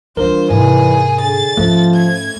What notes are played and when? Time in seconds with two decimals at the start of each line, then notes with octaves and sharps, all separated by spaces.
0.17 E3 G3 D4 F4 A#4 C5
0.50 E2 G#2 C3 E3 G#4
1.21 D3 G#4 A6
1.57 G#2 F3 A3 C#4
1.94 G#6